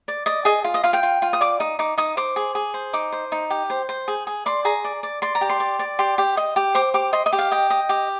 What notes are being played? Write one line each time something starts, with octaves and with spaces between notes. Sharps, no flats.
D5
D5 D#5
G#4 D#5
F4
D#5
F4 F5
G5
F4
F4
D#6
D5 D6
D#4 D#6
D#4 D6
D#4 D#6
C5 D6
G#4
G#4
C5
D#4 D6
C5
D#4
G4
C5
C5
G#4
G#4
D5 C6
G#4 A#5
D5
D5
D5 C6
A#5
G4
C6
D5
D5
G4 C6
G4
D#5
G4
C5 D6
G4 D6
D#5 C6
D#5
G4
F5
D#5 G5
D#5
G4